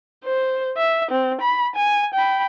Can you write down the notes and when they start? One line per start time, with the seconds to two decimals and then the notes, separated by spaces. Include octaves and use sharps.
0.25 C5
0.77 E5
1.11 C4
1.42 B5
1.76 G#5
2.14 G5 B5